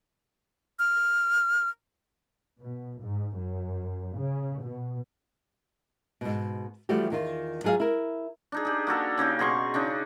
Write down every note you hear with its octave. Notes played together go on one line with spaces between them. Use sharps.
F6
B2
G#2
F#2
C#3
B2
G#2 B2
E3 F3 G3 A3 F#4 G4
E2 D#3 F4
F#3 F4 G#4 E5 F5
E4 A#4
D4 D#4 G#4
G4 G#4
A#3 F#4 A4 F5
C#3 A#3 D#4 G4
B2 G#4 C6 C#6
C#3 D4 D#4